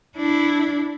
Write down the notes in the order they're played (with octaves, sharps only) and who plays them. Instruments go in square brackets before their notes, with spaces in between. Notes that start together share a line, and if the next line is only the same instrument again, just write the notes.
[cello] D4 E4